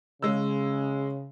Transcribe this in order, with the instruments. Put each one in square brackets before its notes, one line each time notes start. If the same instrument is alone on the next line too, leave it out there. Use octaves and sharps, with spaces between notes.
[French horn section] C#3 [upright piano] G#3 E6